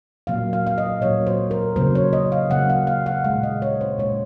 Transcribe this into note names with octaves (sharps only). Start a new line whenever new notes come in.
A#2 F#3 A#3 F5
F5
F5
D#5
A#2 F#3 A#3 C#5
C5
A#4
C#3 F#3 A#3 C5
C#5
D#5
F5
C#3 F#3 A#3 F#5
F5
F5
F#5
G#3 F5
A#2
D#5
C#5
C5
A#2 G#3 C#5